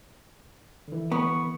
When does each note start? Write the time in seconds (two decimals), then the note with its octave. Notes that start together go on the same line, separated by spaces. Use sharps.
0.88 D3 E3
1.12 B3 C#6